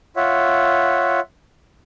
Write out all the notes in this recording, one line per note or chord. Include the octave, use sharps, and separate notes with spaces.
F4 C#5 E5 F#5